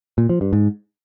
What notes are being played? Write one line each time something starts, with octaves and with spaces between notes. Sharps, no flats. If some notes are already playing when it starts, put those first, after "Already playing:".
A#2
F3
G2
G#2